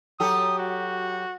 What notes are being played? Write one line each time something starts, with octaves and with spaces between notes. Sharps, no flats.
F#3 G4 A4 D#6
F#4